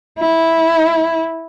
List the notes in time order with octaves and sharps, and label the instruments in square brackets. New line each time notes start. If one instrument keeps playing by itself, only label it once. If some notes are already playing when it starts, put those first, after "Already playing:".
[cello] E4